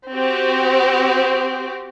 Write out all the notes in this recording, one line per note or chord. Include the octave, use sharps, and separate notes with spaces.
C4 F#4 G4